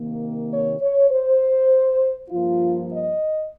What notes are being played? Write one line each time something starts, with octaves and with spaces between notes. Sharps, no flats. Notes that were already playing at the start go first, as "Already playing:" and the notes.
Already playing: C3 D#3 A#3
C#5
C#5
C5
G2 F3 A#3 F4
D#5